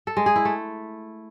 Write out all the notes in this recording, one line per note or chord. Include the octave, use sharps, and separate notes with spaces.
A4
G#3
G#4
E4
A3